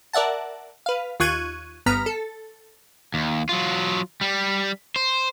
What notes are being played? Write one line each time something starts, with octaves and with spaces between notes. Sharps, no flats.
A#4 D5 E5 F#5 A5
B4 F5
D#2 F4 C#6 F#6 G#6 D#7
G1 G2 B3 A#5 F6 B6
A4
D#2
F#3 F4
G3
C5